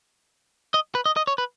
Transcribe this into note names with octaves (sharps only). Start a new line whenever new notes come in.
D#5
B4
D#5
D#5
C#5
B4